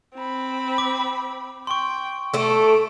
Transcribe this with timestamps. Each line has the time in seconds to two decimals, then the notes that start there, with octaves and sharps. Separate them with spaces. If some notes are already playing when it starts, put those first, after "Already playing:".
0.15 C4 B5
0.78 D6
1.67 G5 C6 C#6
2.34 A3 A4 D6